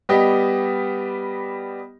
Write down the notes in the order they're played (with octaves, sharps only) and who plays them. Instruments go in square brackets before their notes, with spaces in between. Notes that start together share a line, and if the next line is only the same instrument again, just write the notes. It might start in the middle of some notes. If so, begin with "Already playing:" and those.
[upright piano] G3 B3 G4 D#5